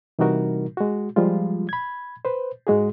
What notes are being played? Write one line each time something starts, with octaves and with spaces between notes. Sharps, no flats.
C3 E3 G3 D#4 F#4 A#4
G#3 F#4
F3 G3 G#3 F4
B5 G#6
B4 C5
G#2 G#3 F#4 G#4